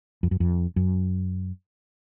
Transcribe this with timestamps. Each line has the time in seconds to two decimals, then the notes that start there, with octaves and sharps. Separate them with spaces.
0.23 F2
0.31 F#2
0.40 F2
0.76 F#2